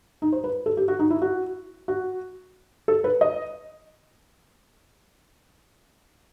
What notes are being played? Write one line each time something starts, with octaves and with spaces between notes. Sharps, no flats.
D#4
C5
B4
A4
G4
F#4
D#4
E4
F#4
F#4
A4
B4
D#5